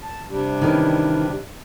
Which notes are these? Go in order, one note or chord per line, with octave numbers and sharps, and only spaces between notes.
A5
C3 G3 D4
D#3 E3 C#4